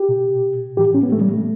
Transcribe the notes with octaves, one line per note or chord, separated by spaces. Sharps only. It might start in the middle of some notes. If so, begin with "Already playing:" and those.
Already playing: G4
B2
A2 E3 G4
C#4
B3
A3
G3
A3